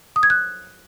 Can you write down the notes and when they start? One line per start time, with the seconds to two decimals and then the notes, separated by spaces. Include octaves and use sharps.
0.16 D#6
0.23 G#6
0.30 F#6